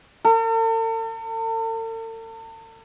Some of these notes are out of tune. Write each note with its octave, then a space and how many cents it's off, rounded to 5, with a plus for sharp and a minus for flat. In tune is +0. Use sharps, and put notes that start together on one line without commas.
A4 +45